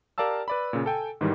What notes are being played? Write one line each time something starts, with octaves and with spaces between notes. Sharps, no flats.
G4 A#4 D5 F5 A5 E6
B4 D5 B5
A#2 C#3
A4 G5 G#5
G#2 D#3 E3 G3